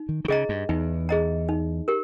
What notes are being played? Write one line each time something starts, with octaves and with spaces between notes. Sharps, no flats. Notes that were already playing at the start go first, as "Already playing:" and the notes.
Already playing: D#4
D#3
D#3
C#3 G#4 D#5 A#5
G2
E2 D#4
G#4 D#5 A#5
D#4
G4 A#4